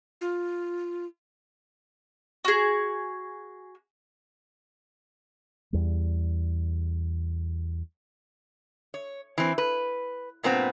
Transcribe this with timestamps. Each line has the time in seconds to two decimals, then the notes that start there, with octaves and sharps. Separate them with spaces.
0.21 F4
2.45 F#4 G#4
5.73 E2 G3
8.94 C#5
9.38 E3 C4
9.58 B4
10.43 G2 A#2 B3 C4